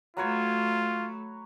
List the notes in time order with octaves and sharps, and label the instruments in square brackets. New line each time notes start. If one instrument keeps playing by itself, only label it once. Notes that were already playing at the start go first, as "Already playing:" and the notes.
[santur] F#3 B4 C#5 [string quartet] A3 [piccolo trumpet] F4